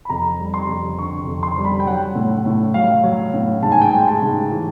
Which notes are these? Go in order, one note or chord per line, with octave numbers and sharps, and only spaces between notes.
B5
F2 A#5
G3
C6
F2
D3 C#6
F2
C6
G3
B5
G5
F#3 F#5
A2
A2
F#3 F5
F#3
A2
G#2 A5
G#5
G5
G#3 G#5
A5
G#2
E3